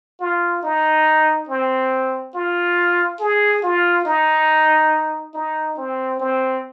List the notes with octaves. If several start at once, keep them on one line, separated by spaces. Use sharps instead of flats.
F4
D#4
C4
F4
G#4
F4
D#4
D#4
C4
C4